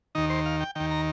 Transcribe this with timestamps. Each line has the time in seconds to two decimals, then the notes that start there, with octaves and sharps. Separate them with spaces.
0.15 D#2 D#3 D#4
0.30 C5
0.46 F5
0.60 G5
0.75 D#2 D#3 G5
0.91 A#5